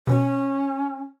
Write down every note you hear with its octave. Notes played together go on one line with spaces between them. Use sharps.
B2 C#4